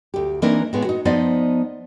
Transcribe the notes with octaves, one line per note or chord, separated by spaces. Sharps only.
D2 G4
E3 A#3 C4 D4 D#4 A#4
A2 G#3 B3
D#4 F#4
F3 B3 D#4 C5 D5 D#5